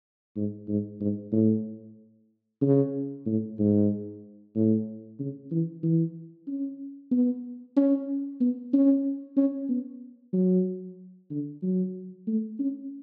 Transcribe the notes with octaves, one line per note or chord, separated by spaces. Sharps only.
G#2
G#2
G#2
A2
C#3
A2
G#2
A2
C#3
E3
E3
C#4
B3
C#4
B3
C#4
C#4
B3
F#3
D3
F#3
A3
C#4